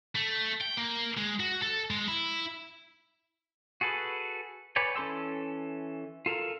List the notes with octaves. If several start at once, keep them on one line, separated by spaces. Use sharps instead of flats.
A3
G5
A#3
G#3
F#4
A4
G#3
E4
F#4 G#4 A4 B4
B4 C#5 D5 G5 G#5
E3 C#4 A4 C6 E6
F4 A4 A#4 F5